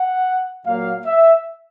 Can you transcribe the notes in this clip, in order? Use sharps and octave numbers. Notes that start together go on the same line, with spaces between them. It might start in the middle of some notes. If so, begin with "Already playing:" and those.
Already playing: F#5
A#2 F#3 A#3 F5
E5